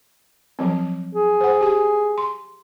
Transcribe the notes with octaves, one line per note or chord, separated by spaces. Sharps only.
F3 F#3 C4
G#4
C5 F#5
G4 G#5
C6